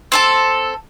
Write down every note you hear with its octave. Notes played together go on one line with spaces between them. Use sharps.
C4 A4 A5